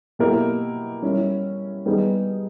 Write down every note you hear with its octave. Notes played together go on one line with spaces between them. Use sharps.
B2 A#3 E4 G4 A#4
G3 C#4 E4
G3 B3 D#4 G#4